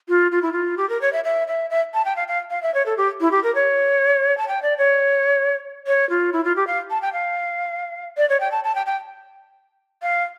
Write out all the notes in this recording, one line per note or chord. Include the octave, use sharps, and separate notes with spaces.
F4
F4
E4
F4
G4
A#4
C#5
E5
E5
E5
E5
A5
G5
F5
F5
F5
E5
C#5
A4
G4
E4
G4
A#4
C#5
A5
G5
D5
C#5
C#5
F4
E4
F4
G4
F5
A5
G5
F5
D5
C#5
G5
A5
A5
G5
G5
F5